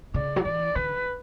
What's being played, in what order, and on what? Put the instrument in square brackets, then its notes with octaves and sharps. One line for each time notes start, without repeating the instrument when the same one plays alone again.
[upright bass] C#3 [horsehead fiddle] D5
[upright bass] F#3
[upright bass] E3 [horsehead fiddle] D5
[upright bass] D3 [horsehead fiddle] B4